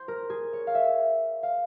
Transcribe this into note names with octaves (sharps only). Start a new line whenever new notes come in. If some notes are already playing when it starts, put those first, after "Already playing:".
Already playing: C5
A#4
G#4
C#5
F5
E5
F5